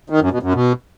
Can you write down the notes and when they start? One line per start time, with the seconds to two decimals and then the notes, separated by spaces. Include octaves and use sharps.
0.10 D#3
0.21 F#2
0.32 B2
0.43 F#2
0.54 B2